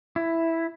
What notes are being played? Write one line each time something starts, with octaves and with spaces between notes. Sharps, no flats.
E4